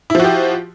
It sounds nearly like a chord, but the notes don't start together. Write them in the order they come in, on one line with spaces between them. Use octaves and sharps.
E4 F3 F#4 G4